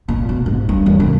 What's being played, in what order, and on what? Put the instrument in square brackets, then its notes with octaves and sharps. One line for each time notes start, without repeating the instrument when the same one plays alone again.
[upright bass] A#2
B2
G#2
G2
E2
C2